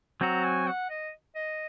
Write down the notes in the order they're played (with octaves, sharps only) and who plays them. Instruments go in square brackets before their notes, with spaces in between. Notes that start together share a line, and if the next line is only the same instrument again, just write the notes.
[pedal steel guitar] F#3 C4 F#4 [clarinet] A#5
[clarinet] G#5
F#5
D#5
D#5